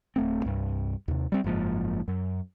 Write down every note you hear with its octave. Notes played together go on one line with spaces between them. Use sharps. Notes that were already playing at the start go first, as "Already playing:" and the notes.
D1 A3 C4
C2 G2
D#2 C3
G3 C4
F#1 G#2 F3 A#3
F#2